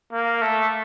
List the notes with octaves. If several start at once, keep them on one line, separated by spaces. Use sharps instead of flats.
A#3
A3